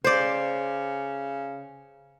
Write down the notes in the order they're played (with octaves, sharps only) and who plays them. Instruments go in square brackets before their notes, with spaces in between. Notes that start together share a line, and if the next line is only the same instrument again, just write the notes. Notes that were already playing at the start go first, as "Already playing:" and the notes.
[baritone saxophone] C#3 [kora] C5 D5